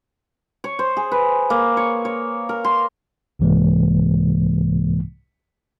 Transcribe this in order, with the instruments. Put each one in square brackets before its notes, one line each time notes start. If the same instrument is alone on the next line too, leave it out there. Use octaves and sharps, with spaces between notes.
[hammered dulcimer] C#5
C5
G#4
B4
A#3
C#5
C#5
A#4
C6
[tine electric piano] C2 G#2 C3 E3 G#3 A#3